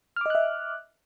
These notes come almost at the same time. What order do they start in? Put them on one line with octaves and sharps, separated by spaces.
F6 D6 D#5 F#6 E5